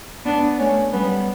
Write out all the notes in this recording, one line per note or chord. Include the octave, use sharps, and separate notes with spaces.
B3 D4
A3 C#4
G3 B3